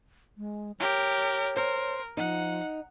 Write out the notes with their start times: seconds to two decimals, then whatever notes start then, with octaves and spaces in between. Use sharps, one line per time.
0.38 G#3
0.80 G4 A#4 C#5
1.56 A#4 C5
2.17 F3 D#4 F#5